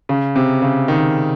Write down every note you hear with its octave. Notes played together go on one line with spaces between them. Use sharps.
C#3
C3
C#3
D#3